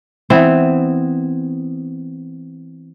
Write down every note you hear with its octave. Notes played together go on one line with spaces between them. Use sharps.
E3 B3 C4